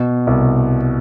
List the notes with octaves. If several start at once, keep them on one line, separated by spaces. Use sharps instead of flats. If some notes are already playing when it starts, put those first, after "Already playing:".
Already playing: B2
C2